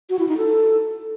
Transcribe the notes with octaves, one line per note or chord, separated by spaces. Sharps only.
F#4
E4
D#4
A4